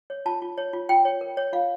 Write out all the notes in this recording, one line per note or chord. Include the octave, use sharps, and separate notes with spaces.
C#5
F4 A5
F4
C#5
F4
F4 G5
C#5
A#4
C#5
F4 F5